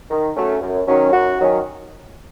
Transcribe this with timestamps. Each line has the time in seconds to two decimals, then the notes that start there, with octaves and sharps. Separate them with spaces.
0.11 D#3
0.36 F#3 A3 C#4
0.62 F#2
0.88 D#3 F#3 C#4
1.13 F#2 F#4
1.39 D#3 F#3 C#4